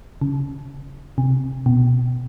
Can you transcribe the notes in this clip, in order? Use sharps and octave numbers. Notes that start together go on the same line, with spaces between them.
C#3
C3
B2